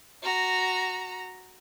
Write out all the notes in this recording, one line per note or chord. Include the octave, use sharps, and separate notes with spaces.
F#4 A#5